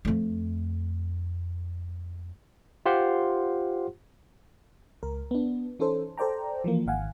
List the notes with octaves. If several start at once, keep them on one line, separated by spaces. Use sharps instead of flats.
F2 A3
F4 G4 C5 F#5 C6
C#2 A#4
B3 D4
E3 C#4 D#4 A4 C5
A4 C5 D5 G5 A#5
E3 F3 A#3
G#1 D#3 F5 F#5 G#5